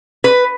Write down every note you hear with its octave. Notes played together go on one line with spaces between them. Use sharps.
B4